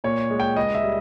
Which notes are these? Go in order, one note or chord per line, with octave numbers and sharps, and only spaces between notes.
A#2 C#5
G#3
G5
C#2 D#5
E5
G3